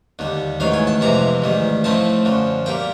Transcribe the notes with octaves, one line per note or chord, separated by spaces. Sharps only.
D#2 D3 G3
A1 G#2 D#3 F#3 F5
G#5
A5
F2 C3 E3 G#3 C4 A#5
A1 G#2 D#3 G3
A2 F3 A3 C4 D#4 A5
F#2 D3 F3
A#2 G3 A#3 G5